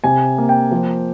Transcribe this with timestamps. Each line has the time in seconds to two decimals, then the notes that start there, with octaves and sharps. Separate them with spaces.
0.04 C3 G#5
0.38 A#3
0.49 G5
0.71 F3